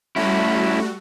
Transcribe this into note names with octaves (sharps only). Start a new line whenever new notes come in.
G3 A3 C#4 E4 F#4